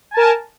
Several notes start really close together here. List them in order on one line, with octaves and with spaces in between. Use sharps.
G#5 A5 A#4